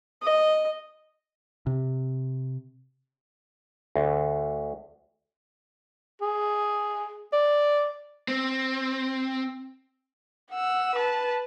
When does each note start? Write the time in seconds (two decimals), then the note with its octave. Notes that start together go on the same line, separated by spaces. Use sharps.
0.23 D#5
1.67 C3
3.96 D2
6.21 G#4
7.33 D5
8.28 C4
10.51 F#5 E6
10.95 B4 A5